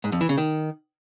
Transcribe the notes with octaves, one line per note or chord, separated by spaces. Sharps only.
G#2
F2
E3
C#3
D#3